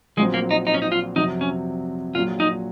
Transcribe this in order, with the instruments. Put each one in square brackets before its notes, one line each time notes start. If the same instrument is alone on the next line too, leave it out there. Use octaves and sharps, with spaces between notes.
[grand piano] A#1 A#2 F#3 C4 [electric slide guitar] G#3
[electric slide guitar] A#3
D#4
D#4
C#4
D#4
F4
[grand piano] F2 C3 F#3 [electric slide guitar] D#4
[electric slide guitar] C#4
[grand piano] A#1 A#2 F#3 [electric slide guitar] F4
[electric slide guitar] D#4